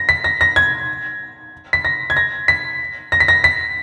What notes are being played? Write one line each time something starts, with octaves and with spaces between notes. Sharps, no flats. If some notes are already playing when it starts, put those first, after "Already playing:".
Already playing: A#6
B6
A#6
A#6
G#6
B6
A#6
G#6
A#6
B6
A#6
B6
A#6
B6